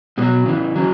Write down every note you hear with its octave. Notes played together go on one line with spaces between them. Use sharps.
B2 F#3 G#3
C#3 E3
C#3 F#3